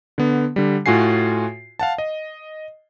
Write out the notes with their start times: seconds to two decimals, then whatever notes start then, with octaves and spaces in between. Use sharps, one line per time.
0.18 D3 B3
0.56 D3 G3
0.86 A2 F4 F#4 G#5 C7
1.79 F5 F#5 A5
1.98 D#5